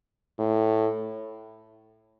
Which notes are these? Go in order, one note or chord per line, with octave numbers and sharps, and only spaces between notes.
A2